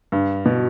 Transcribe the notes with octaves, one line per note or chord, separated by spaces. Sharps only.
G2
B2